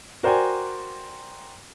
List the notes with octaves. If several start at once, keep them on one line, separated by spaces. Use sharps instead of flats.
F#4 A#4 C5 D5 G5 G#5